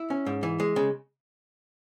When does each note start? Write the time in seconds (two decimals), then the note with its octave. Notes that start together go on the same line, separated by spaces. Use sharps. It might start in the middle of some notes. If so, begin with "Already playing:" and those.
Already playing: E4
0.10 C#4
0.26 G#2
0.43 E3
0.60 G#3
0.76 C#3